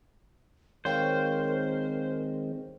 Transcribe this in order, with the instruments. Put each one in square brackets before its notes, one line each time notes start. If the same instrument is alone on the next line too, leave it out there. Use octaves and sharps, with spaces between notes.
[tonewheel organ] D#3 G#3 C4 [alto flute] A#4 [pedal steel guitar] C5 [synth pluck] C#5 F5 G5